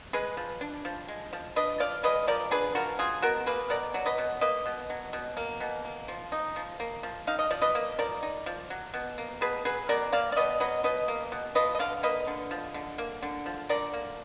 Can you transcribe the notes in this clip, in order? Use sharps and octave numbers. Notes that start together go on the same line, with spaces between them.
G#3 G#4 B4
F3
D4
F3
G#3
F3
D4 B4 D#5
F3 D5 F5
G#3 B4 D#5
F3 A#4 D5
D4 G#4 B4
F3 F#4 A#4
F#3 F4 G#4
B2 F#4 A#4
A#3 G#4 B4
B2 A#4 D5
F#3
B4 D#5
B2
A#3 B4 D#5
B2
F#3
B2
A#3
B2
A#3
F3
D#4
F3
A#3
F3
D#4 F5
D#5
F3 D5
B4 D#5
A#3
F3 A#4 D5
D#4
F3
F#3
B2
A#3
B2 G#4 B4
F#3 G#4 B4
B2 A#4 D5
A#3 D5 F5
D5
B2 B4 D#5
F#3 B4 D#5
B2 B4 D#5
A#3
B2
F3 B4 D#5
D#5
D3 D5 F5
A#3 B4 D#5
D3
F3
D3
A#3
D3
F3
D3 A#4 D5
A#3